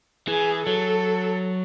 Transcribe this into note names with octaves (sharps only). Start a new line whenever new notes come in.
E3 G#4
F#3 A4